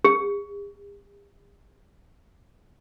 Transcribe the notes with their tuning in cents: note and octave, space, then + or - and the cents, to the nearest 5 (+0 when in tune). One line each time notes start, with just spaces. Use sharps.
G4 +45